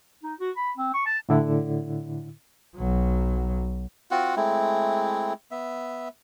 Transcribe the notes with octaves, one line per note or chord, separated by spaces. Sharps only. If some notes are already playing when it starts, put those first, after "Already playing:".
D#4
F#4
B5
C4
C#6
A5
A2 D3 E4
B1 F#3
C4 F4 F#4 F#5
G#3 A3 C4 E4
B3 E5